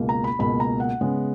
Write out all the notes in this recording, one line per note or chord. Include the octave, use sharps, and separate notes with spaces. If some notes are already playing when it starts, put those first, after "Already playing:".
Already playing: C#2 B2 A#3
A#5
B5
C#2 B2 A#3 B5
A#5
F#5
C#3 G#3 B3